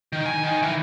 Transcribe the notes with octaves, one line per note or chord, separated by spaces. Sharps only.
D#3
G#5
D#3
E3